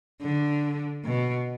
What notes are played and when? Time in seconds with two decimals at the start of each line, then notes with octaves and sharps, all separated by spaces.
0.22 D3
1.05 B2